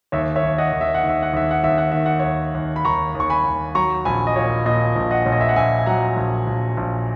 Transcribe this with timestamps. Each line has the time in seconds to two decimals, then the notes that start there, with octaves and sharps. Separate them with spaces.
0.12 D#2 C#5 E5
0.36 C#5 E5
0.43 D#2
0.58 D#5 F#5
0.73 D#2
0.81 E5
0.95 F#5
1.04 D#2
1.09 E5
1.23 F#5
1.33 D#2 E5
1.51 F#5
1.64 D#2 E5
1.78 F#5
1.92 D#3 E5
2.06 F#5
2.20 D#2 C#5 E5
2.55 D#2
2.76 B5
2.85 D#2 A#5 C#6
3.15 D#2
3.20 C#6
3.30 G#5 B5
3.46 D#2
3.75 F#3 A#5 C#6
4.05 A#1 G#5 B5
4.27 D#5
4.36 A#2 C#5
4.66 A#2 D#5
4.96 A#1
5.11 D#5 F#5
5.26 A#1 C#5
5.32 D#5
5.41 E5
5.49 F#5
5.56 A#1 E5 G#5
5.79 G#5
5.86 F#3 F#5 A#5
6.17 A#1
6.47 A#1
6.77 A#1